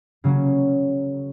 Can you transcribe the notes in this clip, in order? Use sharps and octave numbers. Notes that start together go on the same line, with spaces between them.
C#3 F#3 A#3 C#4 F#4